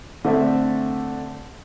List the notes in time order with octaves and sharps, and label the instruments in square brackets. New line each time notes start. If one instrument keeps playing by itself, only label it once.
[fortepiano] D3 A3 C4 E5